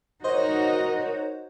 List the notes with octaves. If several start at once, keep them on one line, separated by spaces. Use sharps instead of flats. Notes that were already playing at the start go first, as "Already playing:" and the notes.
D#4 F#4 A#4 C5 C#5 D#5